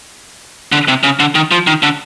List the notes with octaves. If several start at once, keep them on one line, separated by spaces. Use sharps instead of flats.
D3
C3
C#3
D3
D#3
F3
D#3
D3